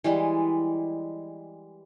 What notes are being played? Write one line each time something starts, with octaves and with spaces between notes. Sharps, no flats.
E3 G3 G#3